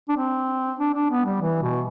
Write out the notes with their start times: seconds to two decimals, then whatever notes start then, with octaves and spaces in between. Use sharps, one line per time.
0.09 D4
0.17 C4
0.79 D4
0.94 D4
1.10 B3
1.25 G3
1.41 E3
1.62 B2